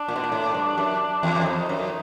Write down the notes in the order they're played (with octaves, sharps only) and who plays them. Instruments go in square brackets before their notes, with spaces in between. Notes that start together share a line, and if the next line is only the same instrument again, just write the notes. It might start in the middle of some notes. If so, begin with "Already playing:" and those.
Already playing: [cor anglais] D4
[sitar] A#2
B2
A#2
A2
G2
F#2
E2
F#2
[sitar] F2 [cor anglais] D#4
[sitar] F#2